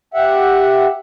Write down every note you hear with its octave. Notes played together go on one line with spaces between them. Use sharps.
G4 E5 F#5